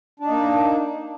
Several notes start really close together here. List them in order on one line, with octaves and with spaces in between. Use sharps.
D4 D#4 A#3